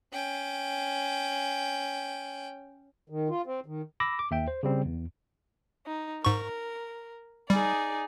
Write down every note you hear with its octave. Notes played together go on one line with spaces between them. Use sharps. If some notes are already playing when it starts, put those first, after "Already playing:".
C#4 G5
D#3
F4
C4
D#3
B5 D6 E6 A#6
D6
D#2 E5 G5
C5
C#3 G3 C4
E2
D#4
G#2 A#4 C#6
G3 D#4 G#4 D5